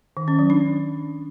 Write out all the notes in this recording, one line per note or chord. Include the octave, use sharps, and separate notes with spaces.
D#3
C#4
F#3
D4